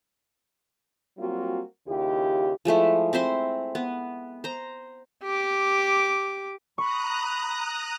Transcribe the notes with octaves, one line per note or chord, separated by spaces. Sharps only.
F#3 G3 A#3 C4 F4 F#4
D#2 C#3 E4 F4 G4
F3 G#3 A3 E4
C4 E4 C5 C6
B3
C5 A#5
G4 D6
A#5 B5 C#6 D#6 F#6